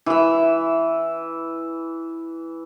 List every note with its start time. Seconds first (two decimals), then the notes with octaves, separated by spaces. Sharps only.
0.06 E3 E5